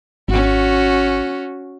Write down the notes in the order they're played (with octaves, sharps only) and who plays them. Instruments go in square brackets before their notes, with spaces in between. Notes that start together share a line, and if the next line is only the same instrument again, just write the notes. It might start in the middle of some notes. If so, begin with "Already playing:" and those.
[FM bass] G#1 [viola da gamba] C#4 F#4